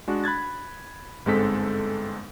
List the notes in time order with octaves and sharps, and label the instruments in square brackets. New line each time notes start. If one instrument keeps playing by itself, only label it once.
[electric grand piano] G#3 D4 F#4
B5 F#6 G#6 A6
G1 G#2 G#3 C4 A4 B6